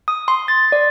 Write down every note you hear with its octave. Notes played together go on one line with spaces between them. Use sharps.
D#6
C6
A6
D5